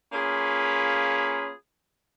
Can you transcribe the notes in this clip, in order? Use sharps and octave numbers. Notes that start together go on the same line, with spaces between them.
A#3 C#4 F4 G#4 B4